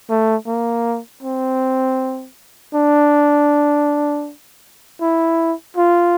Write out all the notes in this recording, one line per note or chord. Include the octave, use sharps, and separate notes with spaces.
A3
A#3
C4
D4
E4
F4